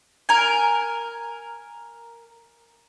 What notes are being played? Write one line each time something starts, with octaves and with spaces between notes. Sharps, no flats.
A#4 G#5